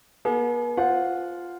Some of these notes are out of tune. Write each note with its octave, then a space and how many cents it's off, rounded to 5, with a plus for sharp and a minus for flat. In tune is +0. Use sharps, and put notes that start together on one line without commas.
B3 -45 G#4 +45
F4 +0 C5 -5 F#5 -10